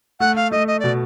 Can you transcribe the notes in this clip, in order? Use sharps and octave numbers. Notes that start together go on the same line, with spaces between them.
A3 F#5
F5
A3 D#5
D#5
B2 D5